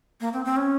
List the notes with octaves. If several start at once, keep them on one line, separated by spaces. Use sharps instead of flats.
A#3
C4
C4
C#4